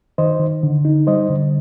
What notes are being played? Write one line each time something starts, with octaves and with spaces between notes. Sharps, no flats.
D#3 C5 D#5
D#3
D3
D#4
G3 C5 D#5
D3